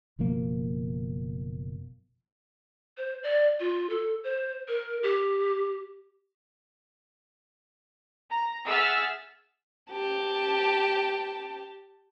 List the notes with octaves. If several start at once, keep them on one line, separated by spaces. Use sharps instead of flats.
F#1 B2 F3 A#3
C5
D5
F4
A4
C5
A#4
G4
A#5
G#4 E5 F#5 E6 F6 A6
G4 A5